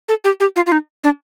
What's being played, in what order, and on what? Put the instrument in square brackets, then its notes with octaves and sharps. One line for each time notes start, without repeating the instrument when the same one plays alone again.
[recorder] A4
G4
G4
F4
F4
D#4
D4